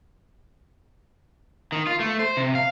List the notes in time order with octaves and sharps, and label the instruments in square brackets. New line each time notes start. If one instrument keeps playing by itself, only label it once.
[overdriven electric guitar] D#3
F4
A3
C5
C3
F5